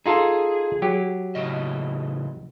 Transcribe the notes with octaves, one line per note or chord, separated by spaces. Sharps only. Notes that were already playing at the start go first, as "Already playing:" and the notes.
D#4 F4 G#4 A4
F#3 G4
A2 C#3 D#5